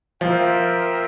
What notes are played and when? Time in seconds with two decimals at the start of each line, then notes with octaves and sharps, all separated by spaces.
0.21 F3 F4 A#4 E5 G5